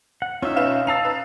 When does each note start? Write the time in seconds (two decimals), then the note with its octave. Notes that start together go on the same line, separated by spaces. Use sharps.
0.22 F#5
0.42 C#4 D#4 F4 E5
0.56 B1 B4 F5 E7
0.87 D#4 A5 E6 A6 C7 F7
1.05 B4